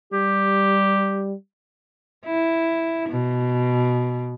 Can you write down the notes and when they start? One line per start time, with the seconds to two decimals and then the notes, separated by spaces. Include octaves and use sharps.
0.13 G3 G4
2.25 E4
3.09 B2